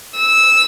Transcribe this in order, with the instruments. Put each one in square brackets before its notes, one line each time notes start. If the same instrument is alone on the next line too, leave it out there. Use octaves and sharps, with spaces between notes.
[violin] E6